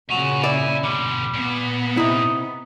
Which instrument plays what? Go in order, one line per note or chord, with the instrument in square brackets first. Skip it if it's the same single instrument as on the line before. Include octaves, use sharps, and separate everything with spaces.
[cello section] A#2 C#3 [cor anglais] F#4 [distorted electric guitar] G#5 A#5
[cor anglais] E4 [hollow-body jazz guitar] D5
[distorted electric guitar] B2 D3 [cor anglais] G3
[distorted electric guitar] A#2 [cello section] B3
[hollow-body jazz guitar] C3 E4 [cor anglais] D#4